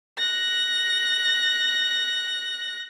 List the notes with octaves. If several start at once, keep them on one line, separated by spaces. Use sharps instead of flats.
F#6 A#6